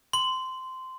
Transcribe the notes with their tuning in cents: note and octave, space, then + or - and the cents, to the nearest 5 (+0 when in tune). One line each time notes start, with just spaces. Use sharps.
C6 -15